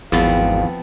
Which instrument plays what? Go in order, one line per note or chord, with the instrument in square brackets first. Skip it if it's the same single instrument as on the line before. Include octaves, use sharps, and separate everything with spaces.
[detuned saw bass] G#1 [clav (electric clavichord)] E2 [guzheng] F3 B3 C4 [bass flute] F5